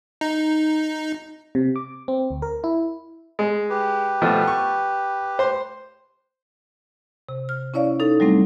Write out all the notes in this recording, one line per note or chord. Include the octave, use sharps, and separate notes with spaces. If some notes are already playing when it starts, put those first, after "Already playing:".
D#4
C3
D6
C4
D2
A#4
E4
G#3
G4 B4
B2 F3 A3
C#6
C5 C6
C3
F6
C#4 E4 C#5 D5 F5
D#4 A4
F#3 G3 A3 C4 D4